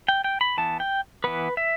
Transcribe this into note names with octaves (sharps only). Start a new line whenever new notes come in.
G5
G5
B5
E3 B3 A5
G5
E3 B3 B4
E5